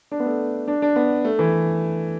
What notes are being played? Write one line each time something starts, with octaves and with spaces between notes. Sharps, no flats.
D4
B3
A3
D4
D4
B3
A3
E3